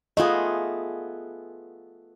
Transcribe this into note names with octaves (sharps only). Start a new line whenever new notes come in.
A3 B3 F4 G#4 D#5